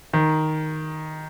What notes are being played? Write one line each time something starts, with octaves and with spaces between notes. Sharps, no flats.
D#3